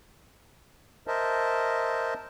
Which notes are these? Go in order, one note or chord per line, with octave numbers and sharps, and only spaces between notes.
A#4 C5 D#5 E5 A5